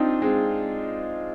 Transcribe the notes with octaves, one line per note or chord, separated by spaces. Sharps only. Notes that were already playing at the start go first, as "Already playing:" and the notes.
Already playing: C4 D4 D#4 F4
G#3 C4